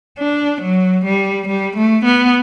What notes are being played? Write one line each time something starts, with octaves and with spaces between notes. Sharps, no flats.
D4
F#3
G3
G3
A3
B3